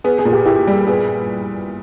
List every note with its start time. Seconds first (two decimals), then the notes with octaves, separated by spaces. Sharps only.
0.04 B3 G#4
0.19 G#4
0.25 A#2
0.33 G4
0.46 E4 G4
0.67 G3 G#4
0.87 B3 G#4